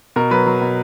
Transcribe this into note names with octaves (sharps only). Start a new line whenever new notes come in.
B2 A#4
F#3 B4
F#3
B2